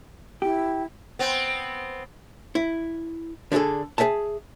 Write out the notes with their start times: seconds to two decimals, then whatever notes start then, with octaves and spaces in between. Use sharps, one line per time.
0.42 E4 G4
1.19 B3 C4
2.55 E4
3.52 D3 D4 E4 G#4 A4
3.98 G#4 C5 E5 G#5 A5